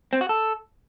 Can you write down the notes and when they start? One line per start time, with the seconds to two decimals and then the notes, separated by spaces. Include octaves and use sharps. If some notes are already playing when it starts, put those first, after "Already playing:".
0.13 C4
0.21 F#4
0.29 A4